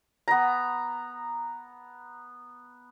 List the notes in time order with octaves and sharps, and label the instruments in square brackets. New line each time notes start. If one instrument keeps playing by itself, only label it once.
[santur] B3 A#5